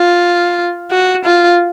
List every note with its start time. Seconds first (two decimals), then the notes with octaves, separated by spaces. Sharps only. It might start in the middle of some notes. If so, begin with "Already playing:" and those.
Already playing: F4
0.92 F#4
1.25 F4